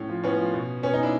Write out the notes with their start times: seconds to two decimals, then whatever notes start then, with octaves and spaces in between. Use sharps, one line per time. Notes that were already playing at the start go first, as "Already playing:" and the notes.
Already playing: A2 C#4
0.09 F3
0.23 A2 B3 C#4
0.39 F3
0.54 B2
0.83 B2 B3 C#4
0.93 C#4 D#4
1.03 D4 E4